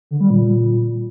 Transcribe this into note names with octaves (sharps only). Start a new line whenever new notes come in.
D3
G3
A#2